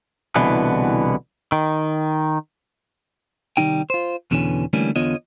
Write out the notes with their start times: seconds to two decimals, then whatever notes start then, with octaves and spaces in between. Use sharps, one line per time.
0.35 C2 B2 D3 E3 B3
1.52 D#3
3.57 C2 F#2 D#3 G3 D#4 G5
3.90 F4 C5
4.31 E2 B2 D3 E3 C#4
4.73 D3 E3 G3 A3 A#3 C#4
4.96 E2 D3 B3 F4 C#5 D#5